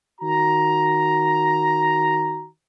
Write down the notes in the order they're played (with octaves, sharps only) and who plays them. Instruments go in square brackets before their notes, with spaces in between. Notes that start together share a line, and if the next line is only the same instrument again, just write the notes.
[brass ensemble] D#3 F#4 A#5